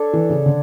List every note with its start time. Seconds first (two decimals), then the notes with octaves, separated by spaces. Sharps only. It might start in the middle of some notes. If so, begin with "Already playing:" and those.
Already playing: D4 A4 C#5
0.13 E3
0.30 C#3
0.46 D3